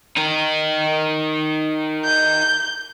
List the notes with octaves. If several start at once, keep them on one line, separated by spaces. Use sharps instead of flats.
D#4 A#4
G6